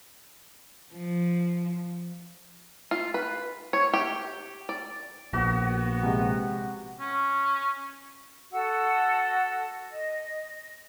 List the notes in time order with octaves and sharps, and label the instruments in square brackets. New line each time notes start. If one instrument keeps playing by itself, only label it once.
[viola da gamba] F3
[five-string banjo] F4
B4
C#5
G4
D5
[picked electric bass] A#1 [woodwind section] B3 [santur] F#4
[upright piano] C3 G#3
[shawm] C#4
[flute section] F#4 A4 F#5 E6
D#5